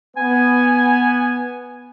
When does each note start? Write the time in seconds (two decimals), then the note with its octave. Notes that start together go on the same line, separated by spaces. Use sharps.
0.17 B3 G#5